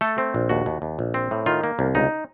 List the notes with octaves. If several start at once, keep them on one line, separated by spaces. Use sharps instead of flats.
A3 A4
C4
A#1
D#2 F#4
D#2
D#2
A#1
C4
A2
D#3 F4
A#3
C2
C#2 D#4